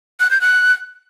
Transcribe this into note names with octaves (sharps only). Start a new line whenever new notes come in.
F#6
G6
F#6